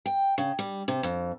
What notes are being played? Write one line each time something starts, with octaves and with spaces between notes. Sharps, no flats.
G5
C#3
G3
C3
F2